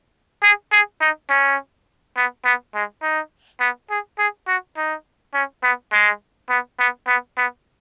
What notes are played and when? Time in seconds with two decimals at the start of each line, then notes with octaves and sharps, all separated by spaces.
0.43 G#4
0.72 G#4
1.01 D#4
1.30 C#4
2.17 B3
2.45 B3
2.75 G#3
3.03 D#4
3.61 B3
3.91 G#4
4.18 G#4
4.48 F#4
4.77 D#4
5.34 C#4
5.63 B3
5.93 G#3
6.50 B3
6.80 B3
7.08 B3
7.37 B3